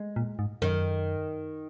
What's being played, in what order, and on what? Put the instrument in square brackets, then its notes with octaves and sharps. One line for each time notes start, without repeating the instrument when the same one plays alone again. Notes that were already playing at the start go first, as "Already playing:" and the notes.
Already playing: [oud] G#3
[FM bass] A#2
G#2
[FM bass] F#2 [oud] D#3